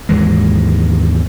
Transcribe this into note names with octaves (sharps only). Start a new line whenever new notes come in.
D#2 G#2 E3 G#3